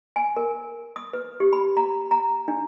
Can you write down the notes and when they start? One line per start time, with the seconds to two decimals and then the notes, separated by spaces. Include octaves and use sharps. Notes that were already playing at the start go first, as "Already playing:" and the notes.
0.16 G#5
0.37 A#4
0.96 D#6
1.13 B4
1.40 G4
1.53 B5
1.77 A#5
2.11 A#5
2.48 D4